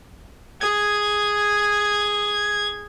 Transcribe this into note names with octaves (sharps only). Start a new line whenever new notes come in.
G#4 G#6